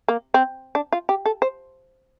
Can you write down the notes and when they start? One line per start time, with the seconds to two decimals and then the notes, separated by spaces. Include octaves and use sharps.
0.08 A#3
0.34 C4
0.75 D4
0.92 F4
1.09 G4
1.26 A4
1.42 C5